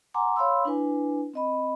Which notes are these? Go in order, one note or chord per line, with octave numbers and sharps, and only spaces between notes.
F#5 G#5 A#5 C6 D6
C#5 F5 B5 C6 E6
D4 E4 B4 G#5
C4 D#5 B5